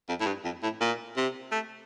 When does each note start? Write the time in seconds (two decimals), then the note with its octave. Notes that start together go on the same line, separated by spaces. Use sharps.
0.09 F2
0.20 A2
0.26 G2
0.45 F2
0.63 A2
0.81 A#2
1.16 C3
1.52 A3